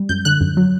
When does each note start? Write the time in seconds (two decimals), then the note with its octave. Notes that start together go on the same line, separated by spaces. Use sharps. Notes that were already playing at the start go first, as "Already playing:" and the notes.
Already playing: G3
0.09 F#2 G6
0.25 D3 F#6
0.41 F#2
0.57 F#3